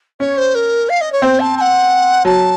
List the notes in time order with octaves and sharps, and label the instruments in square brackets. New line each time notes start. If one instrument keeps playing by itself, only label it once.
[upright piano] C#4 [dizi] C#5
[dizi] C5
A#4
F5
D#5
C#5
[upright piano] C4 [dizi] C5
[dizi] A5
A5
F#5
[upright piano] F#3 [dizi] A5